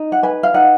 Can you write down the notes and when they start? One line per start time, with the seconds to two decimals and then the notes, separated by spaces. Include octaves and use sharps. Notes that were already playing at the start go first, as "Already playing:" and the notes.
Already playing: D#4
0.12 F#5
0.23 B4 G#5
0.43 F5
0.54 D#4 F#5